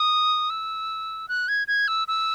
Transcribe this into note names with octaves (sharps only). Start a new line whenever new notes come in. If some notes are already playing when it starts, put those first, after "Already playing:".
Already playing: D#6
E6
F#6
G#6
G#6
E6
E6